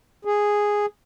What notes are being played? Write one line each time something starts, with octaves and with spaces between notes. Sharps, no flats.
G#4